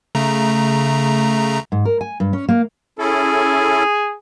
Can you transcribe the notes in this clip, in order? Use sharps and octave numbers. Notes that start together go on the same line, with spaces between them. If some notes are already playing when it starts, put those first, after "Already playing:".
C#3 A3 A#5
G#2
A#4
G#5
G2
C#4
A#3
C#4 E4 G#4 A4